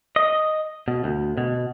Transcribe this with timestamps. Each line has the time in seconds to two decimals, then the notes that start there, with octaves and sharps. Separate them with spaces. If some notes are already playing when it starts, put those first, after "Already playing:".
0.16 D#5
0.88 B2
1.04 D2
1.37 B2